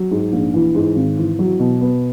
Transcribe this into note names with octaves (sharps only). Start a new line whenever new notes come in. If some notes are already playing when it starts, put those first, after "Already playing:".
Already playing: F#3
G#2
A#1
E3
G#2
G#1
E3
F#3
B2
B3